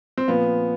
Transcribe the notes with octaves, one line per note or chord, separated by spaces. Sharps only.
C4
A#2 F3 B3